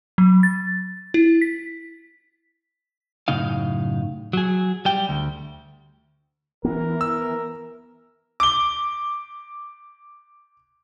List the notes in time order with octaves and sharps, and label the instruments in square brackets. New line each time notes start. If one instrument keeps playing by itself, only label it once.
[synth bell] F#3
A6
E4
B6
[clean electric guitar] F#2 A2 C#3 D#4 F5
F#3 G#4
G3 G5
D2
[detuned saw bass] E3 [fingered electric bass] B3 [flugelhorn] A#4
[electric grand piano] E6
[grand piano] D6 G7